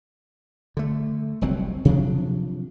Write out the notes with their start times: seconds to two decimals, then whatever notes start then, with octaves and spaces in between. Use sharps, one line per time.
0.77 D3 A3
1.41 F1 C2 F#3 C4
1.85 C3 F3 F#3 D4